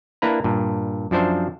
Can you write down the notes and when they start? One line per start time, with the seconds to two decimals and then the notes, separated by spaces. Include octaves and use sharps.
0.22 A#3 D4 E4 B4 A#5
0.44 G2 A#2
1.11 F#2 F3 D4 C5 E5